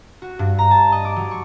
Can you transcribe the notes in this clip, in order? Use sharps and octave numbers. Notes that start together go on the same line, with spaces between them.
F#4
G2
A#5
A5
D#5
D6
F#3
C#6